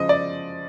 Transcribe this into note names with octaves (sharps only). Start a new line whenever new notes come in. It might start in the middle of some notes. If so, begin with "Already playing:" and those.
Already playing: C#3 F3 G#3 D#5
D5